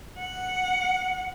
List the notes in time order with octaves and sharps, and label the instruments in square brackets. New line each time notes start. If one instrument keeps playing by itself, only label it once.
[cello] F#5